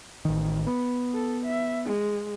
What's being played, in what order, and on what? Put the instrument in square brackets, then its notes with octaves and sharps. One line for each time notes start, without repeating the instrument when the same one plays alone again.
[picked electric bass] A1 D#3
B3
[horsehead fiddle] A4
E5
G#3